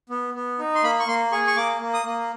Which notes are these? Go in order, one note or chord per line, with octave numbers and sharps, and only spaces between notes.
B3
B3
D#4
C6
A#3 B5
C#6
A#3 C6
G#4 C#6
C#6
A#3 D6
A#3
D#6
A#3